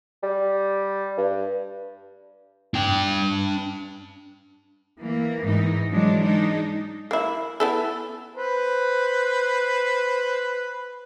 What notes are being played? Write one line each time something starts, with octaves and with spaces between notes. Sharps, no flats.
G3
G2
D4 G5
E3 A#3
G#2 E3 D#4
E3 F#3 G#3 D4
G#3 D4 D#4
A#3 E4
B3 E4 A4
B4 C5